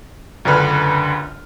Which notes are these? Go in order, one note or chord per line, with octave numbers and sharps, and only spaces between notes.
C#2 F#2 D3 D4 B4 F6